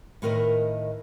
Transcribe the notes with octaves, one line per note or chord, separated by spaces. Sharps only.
A2 D#3 A#4 B4 D#5